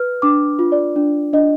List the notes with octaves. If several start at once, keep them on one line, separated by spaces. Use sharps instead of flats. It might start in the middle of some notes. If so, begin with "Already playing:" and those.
Already playing: B4 F6
D4 D6
F4
D5
D4
D4 D#5